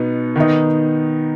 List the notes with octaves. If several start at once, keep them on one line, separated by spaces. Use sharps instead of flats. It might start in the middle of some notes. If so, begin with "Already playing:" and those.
Already playing: B2 B3 D#4
D#3 B3 D#4